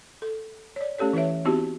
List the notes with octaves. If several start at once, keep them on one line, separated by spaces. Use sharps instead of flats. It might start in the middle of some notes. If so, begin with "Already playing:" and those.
A4
C#5 D5
A3 C#4 G4 A4 C#5
E3 E4 B4 C#5 E5
B3 C4 D#4 E4 F#4 G4